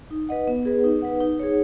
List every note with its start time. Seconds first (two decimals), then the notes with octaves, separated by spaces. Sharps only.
0.11 D#4
0.29 B4 D#5 F#5
0.47 B3
0.65 G#4 B4
0.84 D#4
1.02 B4 F#5
1.21 D#4
1.40 G#4 C#5